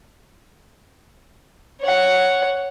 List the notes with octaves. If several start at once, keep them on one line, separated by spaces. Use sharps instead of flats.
C#5 F#5